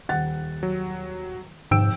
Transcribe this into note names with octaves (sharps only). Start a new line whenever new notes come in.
D#1 F#5 A6
F#3
F1 G#2 G5 E6 D7